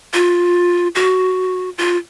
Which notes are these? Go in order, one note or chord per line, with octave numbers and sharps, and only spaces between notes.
F4
F#4
F4